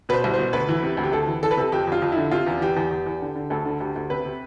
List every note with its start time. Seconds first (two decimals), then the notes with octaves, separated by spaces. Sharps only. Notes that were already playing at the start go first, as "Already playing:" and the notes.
0.09 B2 B4
0.13 C5
0.24 C2
0.34 B2 C5
0.53 D2 B4
0.69 E3
0.83 C3
0.97 D2
1.04 G4
1.12 D2 A4
1.27 E3
1.43 E3 A4
1.51 B4
1.57 C3 A4
1.72 F2 G4
1.87 F2 F4
2.02 F2
2.12 E4
2.17 D3
2.31 C3 F4
2.46 E2
2.61 E3 G4
2.76 E2
2.91 E2
3.06 E2
3.21 D3
3.36 D3
3.50 D2 A4
3.65 D3
3.80 D2 G4
3.96 D2
4.10 C3 B4
4.25 C3